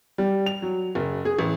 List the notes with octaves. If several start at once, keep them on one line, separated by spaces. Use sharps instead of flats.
G3
F7
F#3
F#1
G#4
A1